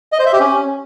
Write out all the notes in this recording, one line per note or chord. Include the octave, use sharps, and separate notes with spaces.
D#5
C5
E5
G4
C#4